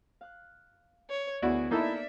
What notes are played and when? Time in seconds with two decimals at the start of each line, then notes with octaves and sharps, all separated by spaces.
0.21 F5 F#6
1.10 C#5
1.42 D2 B3 E4 F#4 G#4 D5
1.71 A#3 D#4 E4 A4 D5 E5